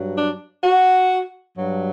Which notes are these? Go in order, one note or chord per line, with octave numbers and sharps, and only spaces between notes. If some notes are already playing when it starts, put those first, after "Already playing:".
Already playing: G2 F#3
D4
F#4
G2 F#3